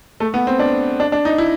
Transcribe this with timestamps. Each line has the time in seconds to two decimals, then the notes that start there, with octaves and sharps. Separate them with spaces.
0.20 A3
0.34 B3
0.47 C4
0.59 D4
1.00 D4
1.12 D4
1.25 D#4
1.38 E4